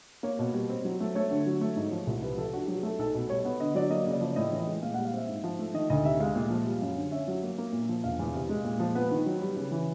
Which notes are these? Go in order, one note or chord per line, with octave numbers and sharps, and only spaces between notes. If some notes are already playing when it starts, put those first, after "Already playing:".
A#3 C#5
B2
G3
C4
F#3
A3
A3 C#5
D3
F#3
A3
G#2
F3
C2
C3 B4
F3 A4
D4 F#4
F#3 G4
G#4
A3 A4
B1 A4
B2
G3 C#5
B3
D3 D#5
F#3 D5
A#3 D#5
C#3
D5
F3
A2 D#5
E3
D#5
G#3
A#2 F5
G3 F#5
F5
C4 E5
G#2
F3
A3
D#3 D#5
D2 D#5
C3 E5
G#3 F5
A#2
F3
G3
F#2
D3
C#4 E5
F#3
A#3
A#3
A#2
F3
E1 F5
E2
C3
G#3
A#2
F3
B3 B4
D#3
F#3
G3
C#3
E3